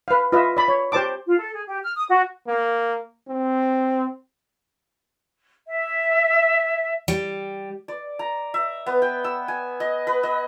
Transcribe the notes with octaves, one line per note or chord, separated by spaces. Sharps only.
B4 F5
F4 B4 D#5 E5
D5 B5
C#5
G4 C5 D5 A5 D6
F4
A4
G#4
G4
F6
D#6
F#4
A#3
C4
E5
G3
D5
A#5
E5
B3
G5
E6
G#5
D#5
B4
D#5